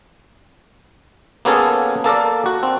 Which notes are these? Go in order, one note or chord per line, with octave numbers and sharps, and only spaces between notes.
A#3 B3 C#4 G#4 A4
A#3 A4 A#4 D5
F#4
C4